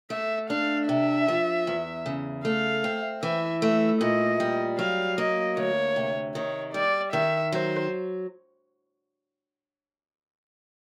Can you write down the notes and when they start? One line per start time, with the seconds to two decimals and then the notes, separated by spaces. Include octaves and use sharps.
0.10 A3 E5
0.50 D4 F5
0.89 C3 E5
1.28 F3
1.67 E2
2.06 C#3
2.45 A3 F5
2.84 C4
3.23 E3 E5
3.62 A3 E5
4.01 A#2 D#5
4.40 G3
4.78 F#3 F5
5.18 A#3 D#5
5.57 D2 C#5
5.96 C3
6.35 D#3 C#5
6.74 G3 D5
7.13 D#3 E5
7.52 F#3 C5